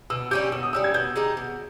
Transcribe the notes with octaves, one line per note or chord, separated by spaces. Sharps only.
B2 E6
G3 C#4 G4 G6
B2 E6
D#6
G3 C#4 G4 E6
G#6
B2 G6
G#3 D#4 G4
B2